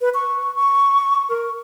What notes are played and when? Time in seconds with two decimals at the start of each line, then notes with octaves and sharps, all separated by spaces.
0.01 B4
0.15 C#6
0.55 C#6
1.29 A#4